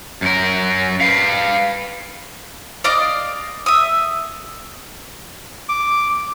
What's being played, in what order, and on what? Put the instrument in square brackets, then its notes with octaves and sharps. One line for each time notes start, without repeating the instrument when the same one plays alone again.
[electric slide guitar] F#2 A#4
B4 F5
[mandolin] D5 D#5 F5 D6
E5 D#6
[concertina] D6